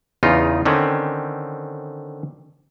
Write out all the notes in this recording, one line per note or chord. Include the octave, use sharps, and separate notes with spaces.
E2 C#3 D#4 F4
D3 D#3 C4 C#4